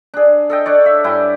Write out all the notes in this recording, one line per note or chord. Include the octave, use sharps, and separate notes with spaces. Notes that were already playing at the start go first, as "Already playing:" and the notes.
D4 G#4
A4 D#5 G5
D4 C#5 D5
E5
G2 E4 G5 G#5